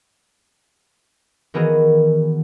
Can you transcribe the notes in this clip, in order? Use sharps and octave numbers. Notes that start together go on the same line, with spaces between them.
D#3 E3 B3 F#4 G#4 A#4